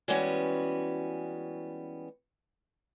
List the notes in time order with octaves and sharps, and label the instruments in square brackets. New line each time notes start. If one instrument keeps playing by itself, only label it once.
[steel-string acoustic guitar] E3 G3 G#3 B3 C#4 F#4